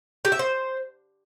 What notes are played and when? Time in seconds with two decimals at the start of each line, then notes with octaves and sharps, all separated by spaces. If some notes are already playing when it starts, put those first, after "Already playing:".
0.25 G4
0.32 E5
0.39 C5